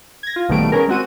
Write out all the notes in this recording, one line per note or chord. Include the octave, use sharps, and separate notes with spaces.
G#6 A#6
F4
A#1 B2 D#3 G3 A3 D7
B3 C#4 G#4 A#4
G#3 C4 F#4 D#7